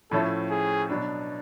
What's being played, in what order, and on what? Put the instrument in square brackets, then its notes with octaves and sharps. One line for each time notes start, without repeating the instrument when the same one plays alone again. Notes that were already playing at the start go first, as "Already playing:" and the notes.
[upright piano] A2 F3 A3 C#4 E4 [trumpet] A4
[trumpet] G#4
[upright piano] B2 F#3 B3 D4